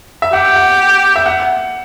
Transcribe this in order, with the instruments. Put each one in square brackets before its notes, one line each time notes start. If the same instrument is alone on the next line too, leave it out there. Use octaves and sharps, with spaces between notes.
[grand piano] E5
[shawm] G4 [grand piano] F#5
[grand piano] F#5
E5
F#5